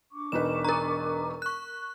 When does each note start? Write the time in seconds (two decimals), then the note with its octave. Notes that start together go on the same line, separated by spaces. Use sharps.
0.11 D4 C#6 D6
0.32 E1 D#4 B4 E7
0.65 A#4 A#5
1.42 C#6 F#6